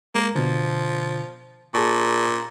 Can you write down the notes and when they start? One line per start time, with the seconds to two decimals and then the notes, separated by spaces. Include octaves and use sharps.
0.15 G#3 A#3 A#4
0.35 B2 D3 F3
1.74 A#2 G#4 A5 C#6